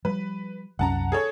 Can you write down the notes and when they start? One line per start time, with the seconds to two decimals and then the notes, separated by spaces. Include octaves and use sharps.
0.05 F3 G3 B4
0.79 C2 F#2 C#4 F#5 A5 A#5
1.12 G#4 A4 C#5